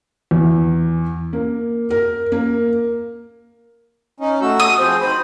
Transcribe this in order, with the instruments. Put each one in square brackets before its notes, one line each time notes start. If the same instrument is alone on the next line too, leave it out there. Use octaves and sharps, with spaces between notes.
[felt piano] E2
A#3
A#4
A#3
[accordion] C#4 D#4
A3 F#4 E6
[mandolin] D#6
[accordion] F3 C4 G#4 [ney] C5
[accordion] D#3 B5 [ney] C5